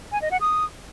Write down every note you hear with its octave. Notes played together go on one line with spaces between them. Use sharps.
G#5
D#5
F#5
D#6